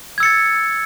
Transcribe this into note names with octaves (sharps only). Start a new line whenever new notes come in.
E6 G#6 A6 C#7